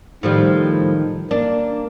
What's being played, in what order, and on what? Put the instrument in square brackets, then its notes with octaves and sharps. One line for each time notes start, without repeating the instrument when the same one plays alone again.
[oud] A2 F3 G3 [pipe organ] D#3
[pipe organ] A#3 [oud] D4